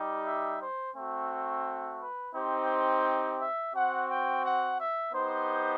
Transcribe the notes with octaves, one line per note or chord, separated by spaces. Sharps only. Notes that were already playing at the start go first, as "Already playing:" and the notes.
Already playing: G3 D#4 G4
E5
C5
A3 C4 F#4
B4
C4 D#4 G4 C5
E5
C4 F#4 F#5
G5
F#5
E5
B3 D#4 G4 C5